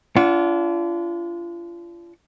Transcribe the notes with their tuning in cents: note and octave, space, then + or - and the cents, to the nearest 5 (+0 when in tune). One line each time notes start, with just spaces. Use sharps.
D4 -30 F4 -35 F#5 +0